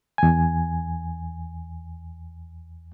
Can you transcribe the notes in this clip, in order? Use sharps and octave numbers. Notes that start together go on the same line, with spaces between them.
E2 G#5